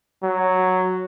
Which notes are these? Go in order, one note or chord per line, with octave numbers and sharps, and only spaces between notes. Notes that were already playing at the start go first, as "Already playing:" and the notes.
F#3